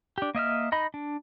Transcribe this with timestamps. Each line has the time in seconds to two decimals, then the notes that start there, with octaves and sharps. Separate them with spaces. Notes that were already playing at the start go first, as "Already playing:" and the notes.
0.18 D4 G4
0.35 A#3 D#5 E5 F6
0.72 D#4 D#5 B5
0.94 D4